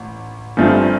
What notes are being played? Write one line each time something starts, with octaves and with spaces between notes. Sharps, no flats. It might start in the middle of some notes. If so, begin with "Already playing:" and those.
Already playing: A1
G1 G2 F3 A3 C4